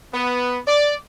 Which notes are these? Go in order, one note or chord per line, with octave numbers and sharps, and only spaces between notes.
B3
D5